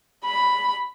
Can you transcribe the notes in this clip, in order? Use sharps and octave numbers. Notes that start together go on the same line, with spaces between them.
B5